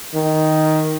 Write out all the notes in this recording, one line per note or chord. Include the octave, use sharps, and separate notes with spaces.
D#3